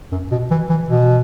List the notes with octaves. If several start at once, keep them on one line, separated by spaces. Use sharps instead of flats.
F#2
B2
E3
E3
B2